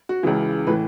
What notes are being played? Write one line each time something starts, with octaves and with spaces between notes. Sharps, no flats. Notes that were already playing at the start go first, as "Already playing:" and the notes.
F#4
C#2 C#3 E3
A2 E3 B4